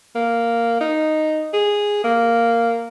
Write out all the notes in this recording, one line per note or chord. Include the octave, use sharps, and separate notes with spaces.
A#3
D#4
G#4
A#3